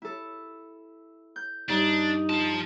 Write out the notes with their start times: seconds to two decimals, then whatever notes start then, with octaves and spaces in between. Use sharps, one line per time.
0.02 E4 A4
1.36 G6
1.69 G2 D4 D#4
2.30 F3 F4 A5